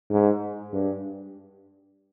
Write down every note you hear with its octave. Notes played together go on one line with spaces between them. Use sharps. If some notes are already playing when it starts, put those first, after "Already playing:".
G#2
G2